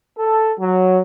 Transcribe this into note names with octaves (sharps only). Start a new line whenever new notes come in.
A4
F#3